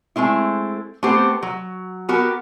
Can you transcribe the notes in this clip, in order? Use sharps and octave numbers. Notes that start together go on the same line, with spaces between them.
G#3 A3 C4 E4
A3 B3 C4 G4 C5
F#3
B3 F#4 G4 A#4